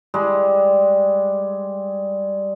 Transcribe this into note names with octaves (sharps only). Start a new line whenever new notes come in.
G3 G#3